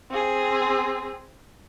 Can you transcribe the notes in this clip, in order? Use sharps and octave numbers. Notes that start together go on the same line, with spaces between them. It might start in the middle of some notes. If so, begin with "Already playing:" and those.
C4 G#4